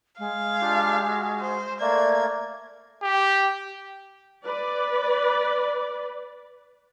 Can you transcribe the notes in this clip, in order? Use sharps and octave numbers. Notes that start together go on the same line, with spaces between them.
G#3 F5
D4 F4 G4
F#4
C5
A3 A#3 D5 G#6
G4
B4 D5